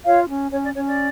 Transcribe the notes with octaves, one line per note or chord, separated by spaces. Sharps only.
F4 C#5 F5
C#4
C#4 C#5
D5
C#4 C#5
D5